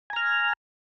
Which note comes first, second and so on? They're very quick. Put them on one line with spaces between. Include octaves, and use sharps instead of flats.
G#5 A#5 F6